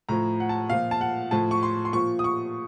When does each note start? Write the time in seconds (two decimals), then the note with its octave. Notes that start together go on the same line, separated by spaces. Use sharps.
0.09 A2 F3 A#5
0.40 F#5
0.49 A5
0.70 A#2 F3 F5
0.91 A5
1.01 F#5
1.31 A2 F3 A5
1.51 C#6
1.63 C6
1.85 C6
1.93 A#2 F3 C#6
2.19 D#6
2.24 C#6